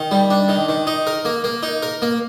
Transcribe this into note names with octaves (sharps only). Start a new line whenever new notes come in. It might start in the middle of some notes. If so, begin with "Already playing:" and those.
Already playing: D#3
G3
D4
D#3
D#3
D#4
A#4
A#3
A#3
D#4
A#4
A#3